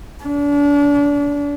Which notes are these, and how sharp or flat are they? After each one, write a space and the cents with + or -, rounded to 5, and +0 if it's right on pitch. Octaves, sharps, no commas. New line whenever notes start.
D4 -35